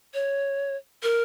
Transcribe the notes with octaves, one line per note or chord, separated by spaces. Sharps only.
C#5
A#4